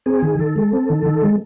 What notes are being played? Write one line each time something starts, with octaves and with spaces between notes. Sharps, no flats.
C4 G#4
D#3
D#3 A4
G#3
C4
D#3
D#3
G#3